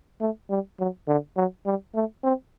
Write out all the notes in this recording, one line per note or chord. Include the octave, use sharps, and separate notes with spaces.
A3
G3
F#3
D3
F#3
G3
A3
C4